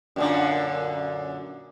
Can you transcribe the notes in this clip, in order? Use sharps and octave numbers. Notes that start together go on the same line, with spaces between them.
F#2 A#2 D3